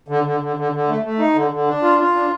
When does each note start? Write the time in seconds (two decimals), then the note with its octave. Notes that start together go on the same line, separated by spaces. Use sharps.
0.08 D3
0.24 D3
0.41 D3
0.56 D3
0.72 D3
0.88 A3
1.03 A3
1.19 D#4
1.35 D3
1.51 D3
1.67 D4
1.82 F4
1.98 F4
2.15 D4